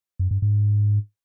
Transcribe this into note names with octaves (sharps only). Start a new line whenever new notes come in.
F#2
G2
G#2